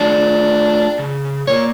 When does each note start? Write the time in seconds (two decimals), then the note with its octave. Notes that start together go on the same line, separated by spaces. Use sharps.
0.01 A3 D4 F4 G#4
0.99 C#3
1.47 A#2 A#3 C#5